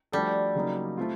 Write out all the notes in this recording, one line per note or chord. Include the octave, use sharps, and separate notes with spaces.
F3 G3 A3 D4 F#4 A4
C#3 F#3 A#3 D#4
A3 C4 F4